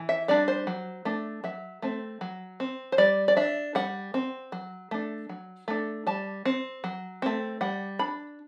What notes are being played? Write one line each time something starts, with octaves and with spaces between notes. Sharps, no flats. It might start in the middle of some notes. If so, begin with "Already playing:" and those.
Already playing: E3
E5
G3 D4 D5
C5
F#3
A3 D4
F#3 E5
A3 C4
F#3
C4
C5
G3 D5
D5
D4 E5
G3 F#5
C4
F#3
A3 D4
F#3
A3 D4
G3 A5
C4
F#3
A3 C4
G3 F#5
D4 B5